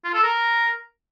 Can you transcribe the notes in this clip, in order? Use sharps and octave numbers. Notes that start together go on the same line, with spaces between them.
F4
A4
A#4